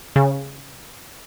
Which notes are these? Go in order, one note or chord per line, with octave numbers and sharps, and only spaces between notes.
C#3